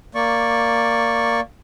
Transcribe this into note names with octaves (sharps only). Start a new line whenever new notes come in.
A#3 D5 C#6